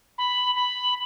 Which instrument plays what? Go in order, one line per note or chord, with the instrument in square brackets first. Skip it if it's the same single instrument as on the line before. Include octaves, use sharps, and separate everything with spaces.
[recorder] B5
B5